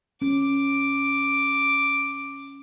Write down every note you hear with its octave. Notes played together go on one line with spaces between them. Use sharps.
C#4 D6